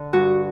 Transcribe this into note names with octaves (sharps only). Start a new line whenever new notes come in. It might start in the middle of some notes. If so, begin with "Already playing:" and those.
Already playing: D3
G2 F#4